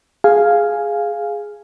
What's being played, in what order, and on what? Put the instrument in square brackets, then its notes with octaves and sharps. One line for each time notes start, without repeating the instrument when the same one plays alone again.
[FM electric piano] G#4 F5 G#5